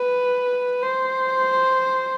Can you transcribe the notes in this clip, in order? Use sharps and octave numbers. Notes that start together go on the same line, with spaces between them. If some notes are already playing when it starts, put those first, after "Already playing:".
Already playing: B4
C5